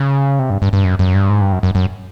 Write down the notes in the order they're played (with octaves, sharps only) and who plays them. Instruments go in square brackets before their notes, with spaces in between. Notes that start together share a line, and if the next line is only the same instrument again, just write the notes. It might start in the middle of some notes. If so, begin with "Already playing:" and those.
Already playing: [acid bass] C#3
C3
G2
G2
G2
F#2
F#2
G2
G#2
G2
F#2
F#2
F#2